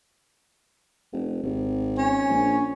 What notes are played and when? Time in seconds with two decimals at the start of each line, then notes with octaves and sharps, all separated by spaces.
1.13 F1
1.43 G#1
1.98 C#4
2.29 A#1